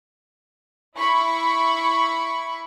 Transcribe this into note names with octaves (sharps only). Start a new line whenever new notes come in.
E4 B5 C#6